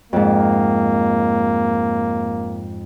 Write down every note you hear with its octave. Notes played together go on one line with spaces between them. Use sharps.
F2 G#2 A#3